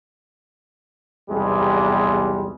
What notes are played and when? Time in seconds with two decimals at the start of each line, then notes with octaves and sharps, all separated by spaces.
1.30 B1 E2 C3 G3 G#3